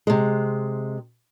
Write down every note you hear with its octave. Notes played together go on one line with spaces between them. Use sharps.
C3 G#3